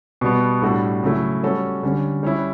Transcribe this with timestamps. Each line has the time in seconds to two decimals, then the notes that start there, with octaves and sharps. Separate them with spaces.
0.21 B2 G3 B3
0.62 A2 G3 D4 F#4 A4
1.03 C#3 F#3 A3 E4
1.43 G3 C#4 F#4 A4
1.83 D3 G3 C#4
2.23 G3 C#4 E4